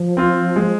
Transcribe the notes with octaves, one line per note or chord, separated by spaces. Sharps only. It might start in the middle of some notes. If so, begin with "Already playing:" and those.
Already playing: F3
C4 F4
G#3